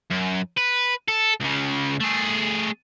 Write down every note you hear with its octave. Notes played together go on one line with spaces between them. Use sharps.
F#2
B4
A4
C#2 C#3
A3 G#4